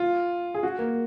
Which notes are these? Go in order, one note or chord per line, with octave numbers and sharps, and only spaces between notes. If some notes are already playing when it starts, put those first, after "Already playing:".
Already playing: F4
G#4
F#4
A#3